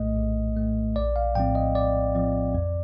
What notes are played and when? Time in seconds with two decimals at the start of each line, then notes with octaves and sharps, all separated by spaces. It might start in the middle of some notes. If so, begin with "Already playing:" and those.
Already playing: A#1 A2 A3 D#5
0.17 A#1
0.56 A2 A3
0.96 A#1 D5
1.16 F5
1.35 A2 F3 C4 G5
1.55 D#5
1.75 A#1 D5
2.15 A2 F3 C4
2.55 F2